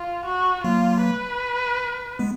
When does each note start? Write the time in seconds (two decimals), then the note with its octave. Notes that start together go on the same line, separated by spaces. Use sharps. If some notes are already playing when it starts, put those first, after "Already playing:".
Already playing: F4
0.26 F#4
0.64 F#3 A#3 F4
1.03 B4
2.19 G#3 B3